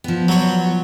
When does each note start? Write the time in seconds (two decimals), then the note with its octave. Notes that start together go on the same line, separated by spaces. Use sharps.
0.04 F3 B3
0.28 F#3 C#5